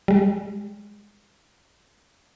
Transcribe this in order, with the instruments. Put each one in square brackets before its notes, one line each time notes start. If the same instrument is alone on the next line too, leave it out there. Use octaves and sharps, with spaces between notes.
[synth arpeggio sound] G3 G#3